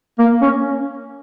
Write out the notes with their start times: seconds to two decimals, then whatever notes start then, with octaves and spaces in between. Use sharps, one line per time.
0.19 A#3
0.41 C#4